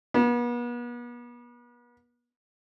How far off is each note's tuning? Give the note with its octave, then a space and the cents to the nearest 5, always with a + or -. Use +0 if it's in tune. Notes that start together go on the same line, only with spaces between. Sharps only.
B3 -40